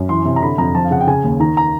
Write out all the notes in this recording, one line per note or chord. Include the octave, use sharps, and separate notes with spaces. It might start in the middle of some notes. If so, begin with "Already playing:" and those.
Already playing: F#2
E3 C6
C3
A#5
D3 B5
F2 A#5
F3 A5
F5
C#3 F#5
G5
C#3 G#5
D#2
D#3 A#5
A#5